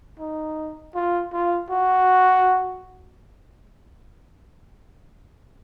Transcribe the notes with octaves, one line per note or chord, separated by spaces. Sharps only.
D#4
F4
F4
F#4